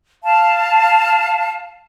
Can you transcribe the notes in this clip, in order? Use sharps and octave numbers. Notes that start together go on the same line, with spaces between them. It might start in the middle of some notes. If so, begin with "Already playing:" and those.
F5 A5